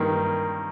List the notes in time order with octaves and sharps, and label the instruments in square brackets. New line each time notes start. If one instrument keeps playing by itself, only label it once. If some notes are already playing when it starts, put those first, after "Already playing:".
Already playing: [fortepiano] G2 D#3 A#3